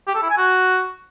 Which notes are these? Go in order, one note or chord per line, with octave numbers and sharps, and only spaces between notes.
G4
A4
E4
G#5
F#4